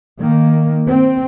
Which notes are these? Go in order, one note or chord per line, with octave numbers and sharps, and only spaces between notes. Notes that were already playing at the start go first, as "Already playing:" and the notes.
D#3 A#3
C4